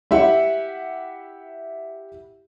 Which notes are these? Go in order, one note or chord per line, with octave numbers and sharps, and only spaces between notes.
E4 G4 E5 F#5